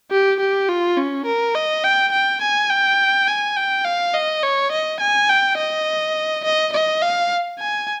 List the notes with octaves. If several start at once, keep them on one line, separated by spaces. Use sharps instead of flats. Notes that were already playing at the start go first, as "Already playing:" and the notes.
G4
G4
F4
C#4
A#4
D#5
G5
G5
G#5
G5
G#5
G5
F5
D#5
C#5
D#5
G#5
G5
D#5
D#5
D#5
F5
G#5